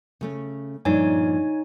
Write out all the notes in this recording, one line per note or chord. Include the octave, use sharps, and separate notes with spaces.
C#3 A3 C#4
G2 A#2 F3 D#4 C#5 G#5